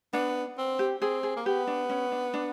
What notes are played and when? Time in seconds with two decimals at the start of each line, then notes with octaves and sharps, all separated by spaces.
0.13 B3 D4
0.58 C4
0.79 G4
1.01 C4 G#4
1.23 G#4
1.36 A#3
1.46 B3 G4
1.67 D4
1.90 C#4
2.12 D4
2.34 D4